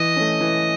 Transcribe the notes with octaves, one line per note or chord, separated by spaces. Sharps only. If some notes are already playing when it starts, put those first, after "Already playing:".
Already playing: E3 D#5
A3 C#4
E3